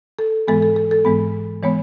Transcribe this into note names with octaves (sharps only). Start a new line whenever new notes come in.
A4
G#2 E3 G#3 B3 A4
A4
A4
A4
G#2 E3 G#3 B3
E3 G#3 B3 C#5